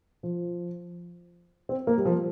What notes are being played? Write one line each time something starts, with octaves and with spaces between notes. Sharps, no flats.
F3
C4
A#3
G3
F3